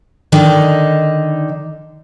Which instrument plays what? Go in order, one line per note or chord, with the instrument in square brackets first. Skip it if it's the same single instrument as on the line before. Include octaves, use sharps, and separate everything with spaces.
[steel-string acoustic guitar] D3 D#3 D4 D#4